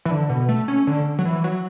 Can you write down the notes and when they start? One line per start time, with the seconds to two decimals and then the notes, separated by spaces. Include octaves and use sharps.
0.05 E3
0.11 D3
0.29 B2
0.49 A3
0.68 C#4
0.87 D3
1.19 F#3
1.25 E3
1.44 F#3